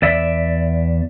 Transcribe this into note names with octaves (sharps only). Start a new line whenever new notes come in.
E2 D5 E5